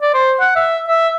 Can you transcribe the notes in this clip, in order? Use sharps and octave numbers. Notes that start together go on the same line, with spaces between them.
D5
C5
F#5
E5
E5